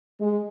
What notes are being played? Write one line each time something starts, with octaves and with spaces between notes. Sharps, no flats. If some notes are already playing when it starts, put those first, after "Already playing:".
G#3